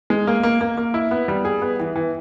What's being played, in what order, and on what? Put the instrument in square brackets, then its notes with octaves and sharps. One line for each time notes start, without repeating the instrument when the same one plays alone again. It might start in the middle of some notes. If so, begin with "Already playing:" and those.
[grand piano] G#3
A#3
A#3
A#3
A#3
E4
B3
G3
G#4
B3
E3
E3